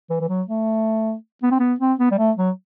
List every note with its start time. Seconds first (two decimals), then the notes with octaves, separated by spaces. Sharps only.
0.10 E3
0.20 E3
0.29 F#3
0.48 A3
1.43 B3
1.51 C4
1.59 B3
1.80 C4
1.99 B3
2.11 G3
2.18 A3
2.37 F#3